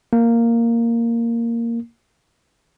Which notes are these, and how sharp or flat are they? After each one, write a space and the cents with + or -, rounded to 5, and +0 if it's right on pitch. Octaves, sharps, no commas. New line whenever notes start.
A#3 -5